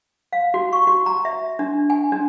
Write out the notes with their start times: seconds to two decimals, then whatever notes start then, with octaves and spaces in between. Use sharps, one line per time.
0.33 F5
0.54 F#4
0.73 C#6
0.87 F#4
1.06 A#5
1.25 E5
1.59 D4
1.90 G#5
2.12 D4